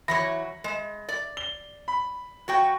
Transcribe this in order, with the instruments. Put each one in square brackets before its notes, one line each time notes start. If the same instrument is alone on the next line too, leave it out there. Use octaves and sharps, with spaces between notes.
[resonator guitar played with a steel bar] E3 F#3 C#5 [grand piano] B5 A#6
[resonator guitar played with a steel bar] G#3
D5
[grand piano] G7
B5
[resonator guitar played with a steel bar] F#3 F#4 G5